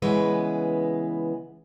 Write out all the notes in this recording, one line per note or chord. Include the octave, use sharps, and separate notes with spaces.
C#3 E3 G#3 B3 B4